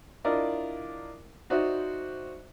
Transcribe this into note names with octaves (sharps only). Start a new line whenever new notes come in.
D4 E4 F4 A#4 D5 D#5
D#4 F#4 C5 D5 E5